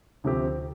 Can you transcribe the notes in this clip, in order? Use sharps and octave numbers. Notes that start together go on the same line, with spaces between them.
D2 C3 F3 C4 G4